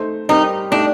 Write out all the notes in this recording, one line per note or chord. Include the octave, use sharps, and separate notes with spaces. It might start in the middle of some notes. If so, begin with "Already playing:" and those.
Already playing: A3 D#4 A4 C5
G3 C4 D#4 G4 A#4
A3 D4 D#4 G4